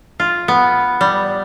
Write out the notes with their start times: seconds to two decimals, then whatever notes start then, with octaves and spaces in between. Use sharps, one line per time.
0.20 F4
0.48 B3
1.01 G3